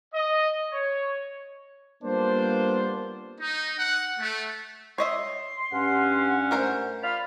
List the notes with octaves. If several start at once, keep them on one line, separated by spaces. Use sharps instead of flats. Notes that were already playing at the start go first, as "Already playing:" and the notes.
D#5
C#5
G3 A#3 B3 D4 F4 C5
D#4
F#5
A3
C#5 D#5 E5 C6
G2 C#4 F#5
A3 A#4 C5
F4 D5 F5 B5 F6